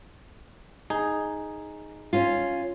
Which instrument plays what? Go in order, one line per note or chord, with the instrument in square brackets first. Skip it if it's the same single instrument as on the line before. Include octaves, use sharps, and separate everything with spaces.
[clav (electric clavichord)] D#4 G#4
[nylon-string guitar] C#4 F4